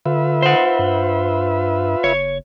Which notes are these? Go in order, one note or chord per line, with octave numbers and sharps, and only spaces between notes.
D3 F4 B4 E5
C5 F#5
G2
F#1 C#5